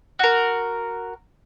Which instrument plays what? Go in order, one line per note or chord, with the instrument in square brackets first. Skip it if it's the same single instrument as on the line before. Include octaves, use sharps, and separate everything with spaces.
[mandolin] F#4 A#4